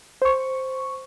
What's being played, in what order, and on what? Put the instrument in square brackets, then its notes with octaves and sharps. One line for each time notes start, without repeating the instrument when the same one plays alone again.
[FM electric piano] C5 C#6